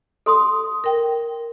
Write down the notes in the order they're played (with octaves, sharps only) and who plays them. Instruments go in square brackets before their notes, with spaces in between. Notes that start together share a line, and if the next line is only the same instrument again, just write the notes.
[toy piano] A4 C6 D#6
[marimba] A#4 G5